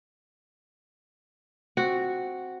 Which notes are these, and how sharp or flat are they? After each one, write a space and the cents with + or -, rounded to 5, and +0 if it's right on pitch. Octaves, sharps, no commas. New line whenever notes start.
C4 +0 F#4 +0